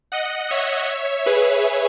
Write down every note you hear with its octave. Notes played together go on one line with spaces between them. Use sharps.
D#5 F#5
C#5 E5
G#4 B4